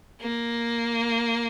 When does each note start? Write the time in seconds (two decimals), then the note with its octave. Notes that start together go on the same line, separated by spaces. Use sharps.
0.21 A#3